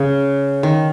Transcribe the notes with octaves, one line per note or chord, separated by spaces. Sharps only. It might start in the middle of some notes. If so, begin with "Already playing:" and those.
Already playing: C#3
D#3